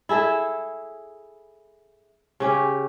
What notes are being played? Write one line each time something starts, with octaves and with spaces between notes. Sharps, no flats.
E4 G#4 A4 E5
C#3 C#4 G4